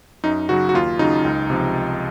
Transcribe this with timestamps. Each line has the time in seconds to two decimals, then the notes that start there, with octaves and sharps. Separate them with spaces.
0.24 F#2 D#4
0.49 C#3 F#3 F#4
0.69 F#4
0.74 D#2 F4
0.99 C#3 F#3 D#4
1.25 C#2
1.50 C3 F3